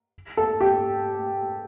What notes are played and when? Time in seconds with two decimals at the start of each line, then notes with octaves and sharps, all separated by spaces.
0.37 A4
0.61 G4